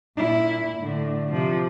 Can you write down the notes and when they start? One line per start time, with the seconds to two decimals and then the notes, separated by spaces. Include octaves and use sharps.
0.17 A#2 E4
0.78 A2 D3
1.32 C3 F3